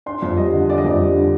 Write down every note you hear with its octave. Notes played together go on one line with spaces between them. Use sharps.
D4 C6
F2
G3 D#5
D3
D4 D5
D#5
F2 D5
G3
D3